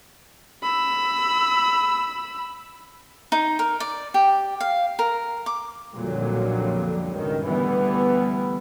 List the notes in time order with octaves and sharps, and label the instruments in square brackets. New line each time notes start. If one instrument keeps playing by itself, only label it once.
[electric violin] B5 E6
[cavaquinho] D#4
A#4
D5
G4
F5
A#4
D6
[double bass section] B1 F2 A#2 D3 F#3 G3
C#2 G2 D#3
D2 E3 G3 B3